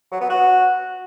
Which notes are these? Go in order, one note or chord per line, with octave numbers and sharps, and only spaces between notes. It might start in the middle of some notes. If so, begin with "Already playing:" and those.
F#3
B3
F#4